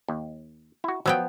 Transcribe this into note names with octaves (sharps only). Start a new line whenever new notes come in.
D#2
E4 F#4
F3 F#3 B3 G5